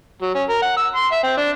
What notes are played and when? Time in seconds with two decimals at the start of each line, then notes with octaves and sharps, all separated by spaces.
0.22 F#3
0.35 C#4
0.49 A#4
0.62 F#5
0.77 E6
0.96 C6
1.12 E5
1.23 C4
1.37 D4